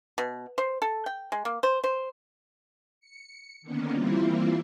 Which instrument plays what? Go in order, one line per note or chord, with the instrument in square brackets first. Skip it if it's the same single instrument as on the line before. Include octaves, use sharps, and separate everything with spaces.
[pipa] B2
C5
A4
G5
G#3
A#3
C5
C5
[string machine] C#7
D3 D#3 A#3 B3 C#4
E3 G3 A#3 C4 E4 F4